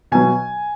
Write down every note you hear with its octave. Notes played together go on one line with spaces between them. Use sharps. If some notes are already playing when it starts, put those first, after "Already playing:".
B2 F#3 G#5